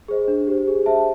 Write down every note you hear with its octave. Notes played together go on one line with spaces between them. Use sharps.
G#4 C5 D#5
D4
G4 C5
G#4
C5 E5 A5